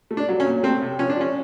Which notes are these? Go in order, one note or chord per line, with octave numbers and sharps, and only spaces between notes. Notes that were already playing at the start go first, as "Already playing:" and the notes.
A3
D4
F#3
C#4
A#2
A3 C4
C3
F3 C#4
D4
F3 C#4